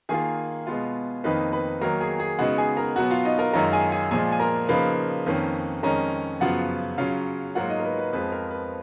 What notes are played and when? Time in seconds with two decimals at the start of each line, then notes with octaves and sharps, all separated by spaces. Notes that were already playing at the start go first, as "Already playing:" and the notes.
0.09 D#3 A#3 F4 G#4 G#5
0.67 B2 G#3 B3 F4
1.24 F2 D#3 A#3 D#4 B4 B5
1.53 B4 B5
1.81 D#3 F#3 A#3 D#4 A#4 A#5
2.01 G#4 G#5
2.20 G#4 G#5
2.39 C#3 G#3 B3 D#4 F#4 F#5
2.58 G#4 G#5
2.77 A#4 A#5
2.96 B2 F#3 B3 F#4 F#5
3.11 F4 F5
3.25 D#4 D#5
3.39 A#4 A#5
3.53 F#2 D#3 G#3 C#4 F4 A#4 A#5
3.73 G#4 G#5
3.92 G#4 G#5
4.11 A#2 F3 G#3 G#4 G#5
4.32 G#5
4.40 A#4 A#5
4.68 C#3 F3 A#3 D#4 B4 B5
5.26 F2 D#3 A#3 C#4
5.83 F2 D#3 G#3 C#4 A#4 A#5
6.40 F#2 C#3 F3 B3 F4 F#4 F#5
6.98 C#3 F#3 C#4 F4 F5
7.55 G#2 F#3 A#3 F4 F#4 F#5
7.70 D#4 D#5
7.80 A#4
7.85 B4
7.98 B4
8.13 F2 F3 G#3 B4
8.32 A#4
8.51 B4